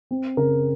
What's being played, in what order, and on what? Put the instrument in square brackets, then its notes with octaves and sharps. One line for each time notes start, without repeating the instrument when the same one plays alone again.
[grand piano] C4
C#3 A#4